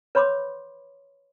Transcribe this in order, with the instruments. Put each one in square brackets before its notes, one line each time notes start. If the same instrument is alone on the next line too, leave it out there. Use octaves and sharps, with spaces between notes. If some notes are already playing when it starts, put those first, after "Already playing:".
[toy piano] B4 C#5 B5 C6 D6